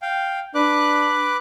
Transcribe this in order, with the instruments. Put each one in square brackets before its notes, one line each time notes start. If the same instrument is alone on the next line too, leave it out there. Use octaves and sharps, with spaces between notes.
[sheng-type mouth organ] F5 G5
[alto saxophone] D4 [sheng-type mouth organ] B4 D6 F#6